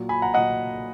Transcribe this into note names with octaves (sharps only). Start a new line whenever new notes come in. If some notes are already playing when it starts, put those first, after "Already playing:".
Already playing: A#2 F#3
G#5 B5
F#5 A#5
A#2 F#3 D#5 F#5